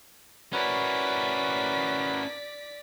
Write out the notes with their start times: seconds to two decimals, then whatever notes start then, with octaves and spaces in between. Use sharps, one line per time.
0.53 C#4 E4 F#4 A#4 B4 D5 B6